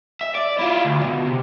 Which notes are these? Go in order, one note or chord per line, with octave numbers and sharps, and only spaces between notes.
E5
D5
E4 F4
D2
B2
C3